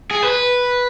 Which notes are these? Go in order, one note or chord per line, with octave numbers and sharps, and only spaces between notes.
G#4
B4